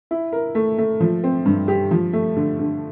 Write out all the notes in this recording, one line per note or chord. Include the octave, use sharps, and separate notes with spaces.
E4
A#4
A3
A3
F3
C4
G2
G4
F3
A3
D3
D3